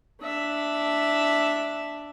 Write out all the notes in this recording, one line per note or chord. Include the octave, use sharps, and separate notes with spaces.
D4 E5